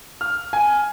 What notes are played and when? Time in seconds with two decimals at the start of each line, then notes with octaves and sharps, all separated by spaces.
0.21 F6
0.53 G#5